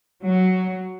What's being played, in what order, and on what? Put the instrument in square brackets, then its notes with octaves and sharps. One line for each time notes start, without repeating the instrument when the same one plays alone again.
[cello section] F#3